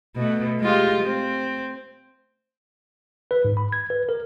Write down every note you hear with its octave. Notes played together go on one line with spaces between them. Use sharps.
B2 A3
G#3 F4 G4
C4
B4
G#2
B5
G#6
B4
A#4